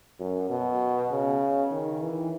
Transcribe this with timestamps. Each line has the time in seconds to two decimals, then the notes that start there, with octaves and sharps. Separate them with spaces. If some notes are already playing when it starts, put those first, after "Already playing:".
0.19 F#2
0.50 B2
1.11 C#3
1.71 D#3
2.02 E3